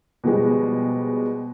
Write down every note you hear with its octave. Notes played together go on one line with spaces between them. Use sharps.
B2 F3 G3 G#3